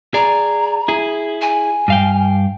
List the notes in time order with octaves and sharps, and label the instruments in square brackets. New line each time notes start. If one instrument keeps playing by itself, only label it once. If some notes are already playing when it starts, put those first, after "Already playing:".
[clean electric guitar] G#4 D5 [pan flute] A#5
[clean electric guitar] E4 G#4
[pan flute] G#5
[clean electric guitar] G2 F5 G5